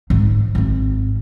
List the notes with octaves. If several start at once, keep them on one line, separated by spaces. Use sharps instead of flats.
G#2 D#4
G#1 C4